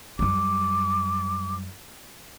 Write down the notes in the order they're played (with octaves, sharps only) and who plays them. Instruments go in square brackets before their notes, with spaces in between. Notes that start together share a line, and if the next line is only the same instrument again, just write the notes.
[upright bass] F#2 G3 [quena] D6